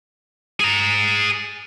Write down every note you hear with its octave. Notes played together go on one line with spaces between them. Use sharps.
G#4 A#5